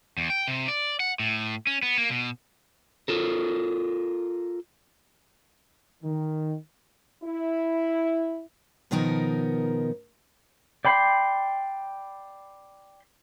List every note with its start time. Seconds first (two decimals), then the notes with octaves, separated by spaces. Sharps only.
0.18 E2
0.30 G5
0.48 C3
0.68 D5
1.00 F#5
1.20 A2
1.67 C#4
1.82 B3
1.98 A#3
2.11 B2
3.08 F4 A4 A#4
6.04 D#3
7.24 E4
8.91 B2 D#3 F3 B3 D#4 A#4
10.85 D5 G5 B5 C6